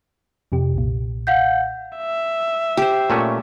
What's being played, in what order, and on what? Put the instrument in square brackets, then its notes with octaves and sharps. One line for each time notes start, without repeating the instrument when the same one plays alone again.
[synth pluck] F2 C3 G4
B1 A#2
[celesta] F5 F#5 G6
[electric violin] E5
[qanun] G4 C5
[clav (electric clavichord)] A#2 A3 C#4